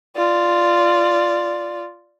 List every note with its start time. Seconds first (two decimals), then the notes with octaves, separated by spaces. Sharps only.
0.16 F4 D5